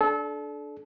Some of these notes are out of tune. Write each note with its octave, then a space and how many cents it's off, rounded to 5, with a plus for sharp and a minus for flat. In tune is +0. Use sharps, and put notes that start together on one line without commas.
D4 +0 A4 -30